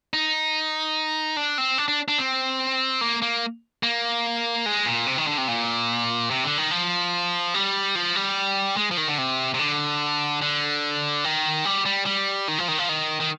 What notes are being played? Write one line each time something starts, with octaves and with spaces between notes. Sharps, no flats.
D#4
D4
C4
D4
D4
D4
C4
A#3
A#3
A#3
G#3
A#2
C3
D#3
D3
C3
A#2
C3
D3
D#3
F3
G3
F3
G3
G#3
F3
D#3
D3
C3
C3
D3
D3
D#3
G3
G3
G3
D#3
F3
D#3
F3
D#3
D#3